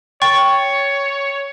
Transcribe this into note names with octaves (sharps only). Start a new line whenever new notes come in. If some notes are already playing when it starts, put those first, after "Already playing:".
C#5 G5 C#6 A6